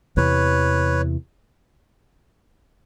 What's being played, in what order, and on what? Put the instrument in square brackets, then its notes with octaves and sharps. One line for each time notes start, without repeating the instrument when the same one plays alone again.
[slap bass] E2 C3 E3 [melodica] B4 C#5